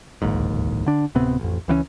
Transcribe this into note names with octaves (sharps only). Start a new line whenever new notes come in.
D1 A#1 D#2 G#2
D3 D4
D1 C3 B3 C4
A1 F2
C#2 E3 A#3 C#4